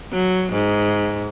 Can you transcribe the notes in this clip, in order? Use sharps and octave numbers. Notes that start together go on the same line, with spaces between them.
F#3
G#2